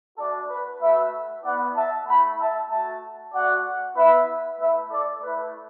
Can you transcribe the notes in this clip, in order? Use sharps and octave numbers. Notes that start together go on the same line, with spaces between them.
A3 D4 F#4 A4 D5
B4
A3 F#4 B4 E5
B3 E4 D5 F#5
E5 A5
A3 E4 F#5 B5
E5 A5
A3 F#4 E5 A5
A3 F#4 D5 F#5
B3 E4 B4 E5
A3 E4 B4 E5
A4 D5
A3 E4 B4